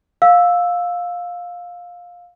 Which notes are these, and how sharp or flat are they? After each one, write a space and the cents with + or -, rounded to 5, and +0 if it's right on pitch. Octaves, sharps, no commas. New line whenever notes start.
F5 +15 E6 +0